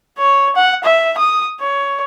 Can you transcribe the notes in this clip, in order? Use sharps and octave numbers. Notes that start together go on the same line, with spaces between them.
C#5
F#5
E5
D#6
C#5